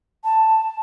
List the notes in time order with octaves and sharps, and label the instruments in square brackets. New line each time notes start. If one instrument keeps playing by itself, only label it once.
[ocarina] A5